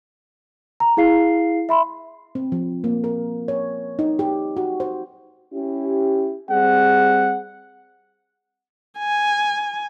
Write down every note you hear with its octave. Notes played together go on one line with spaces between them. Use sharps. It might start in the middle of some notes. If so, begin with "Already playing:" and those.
A#5
E4 G#4 F5 C7
E5 B5 C6
C4
F3
A#3
A#4
C#5
D#4
G4
F#4
C5
C#4 E4 G4
G3 C4 G#4 F#5
G#5